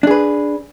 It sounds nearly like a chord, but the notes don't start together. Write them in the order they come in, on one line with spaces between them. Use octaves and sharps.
D4 G#4 B4